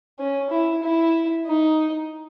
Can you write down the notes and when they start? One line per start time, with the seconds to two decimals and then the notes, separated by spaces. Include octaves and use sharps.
0.19 C#4
0.50 E4
0.83 E4
1.46 D#4